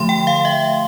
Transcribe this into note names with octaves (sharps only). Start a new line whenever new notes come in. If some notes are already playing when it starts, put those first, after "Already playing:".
Already playing: D3 F3 A3 C6
G5
F5
E5